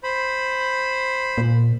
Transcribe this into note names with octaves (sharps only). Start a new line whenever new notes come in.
C5 B5
A#2